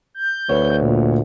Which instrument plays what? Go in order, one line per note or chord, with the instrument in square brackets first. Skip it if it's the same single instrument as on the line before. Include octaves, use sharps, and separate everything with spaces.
[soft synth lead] G6
[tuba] D2 [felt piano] B4 C#5
[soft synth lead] A#2